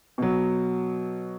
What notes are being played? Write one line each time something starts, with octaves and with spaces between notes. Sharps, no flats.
B2 F#3